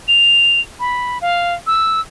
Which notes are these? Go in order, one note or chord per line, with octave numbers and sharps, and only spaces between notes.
F7
B5
F5
E6